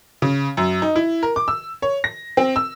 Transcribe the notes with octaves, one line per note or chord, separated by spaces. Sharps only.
C#3
F#2
D#4
E4
A#4
D6
E6
C#5
A#6
C4
E6